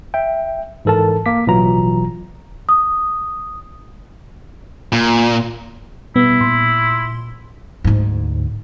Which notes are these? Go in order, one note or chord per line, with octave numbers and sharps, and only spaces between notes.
E5 G5
G#2 E3 A4 A#4 A5
A#3 D6 B6
A1 B2 E3 F#3 F4 A#5
D#6
A#2
B2 G3 B3 E4
A#2 C6
D2 G#2